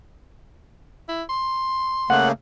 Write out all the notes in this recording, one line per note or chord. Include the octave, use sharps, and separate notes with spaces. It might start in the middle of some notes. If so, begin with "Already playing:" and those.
E4
C6
C#3 A3 A#3 F#5